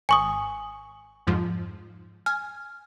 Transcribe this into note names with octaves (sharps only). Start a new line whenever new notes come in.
G#1 G#5 C#6 D#6
F2 G#2 F3
G#5 F6